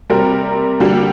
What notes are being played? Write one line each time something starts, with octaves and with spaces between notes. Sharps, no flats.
C3 G3 C4 A#4
D3 G3 A#3